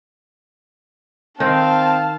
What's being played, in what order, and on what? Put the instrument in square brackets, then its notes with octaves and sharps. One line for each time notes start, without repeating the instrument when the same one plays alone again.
[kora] D#3 [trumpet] C4 [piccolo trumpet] F5 [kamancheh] A5